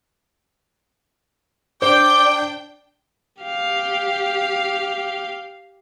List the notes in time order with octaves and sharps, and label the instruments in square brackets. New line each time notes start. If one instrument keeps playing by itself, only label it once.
[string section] D4 G5 [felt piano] C5 [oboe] D6
[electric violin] G4 F5